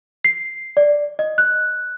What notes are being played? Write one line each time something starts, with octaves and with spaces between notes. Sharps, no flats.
C7
D5
D#5
F#6